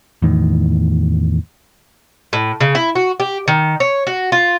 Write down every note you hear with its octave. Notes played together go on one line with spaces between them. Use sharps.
E2 A2 D#3
A2
C#3
E4
F#4
G4
D#3
C#5
F#4
F4